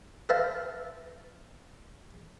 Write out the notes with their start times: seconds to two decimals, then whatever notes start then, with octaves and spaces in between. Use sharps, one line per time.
0.29 B4 C5 E5 F5 A5 A#5